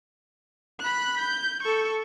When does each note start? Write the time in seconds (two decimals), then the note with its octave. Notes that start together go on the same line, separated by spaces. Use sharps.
0.80 B5 F#6
1.19 G6
1.63 A4 C#6